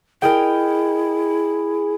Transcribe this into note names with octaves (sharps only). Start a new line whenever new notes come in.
E4 G#4 A#4 D#5 G5